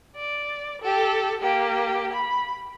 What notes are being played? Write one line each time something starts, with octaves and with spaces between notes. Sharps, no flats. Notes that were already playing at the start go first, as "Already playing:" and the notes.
D5
G4 A4
A#3 G4
B5